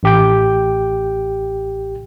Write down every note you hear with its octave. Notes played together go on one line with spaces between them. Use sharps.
A1 G4 G5